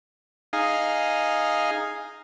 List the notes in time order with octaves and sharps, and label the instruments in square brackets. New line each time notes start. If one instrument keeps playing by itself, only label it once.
[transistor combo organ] D#4 G#4 F5